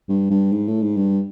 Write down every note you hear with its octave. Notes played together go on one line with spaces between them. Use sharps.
G2
G2
G#2
A2
G#2
G2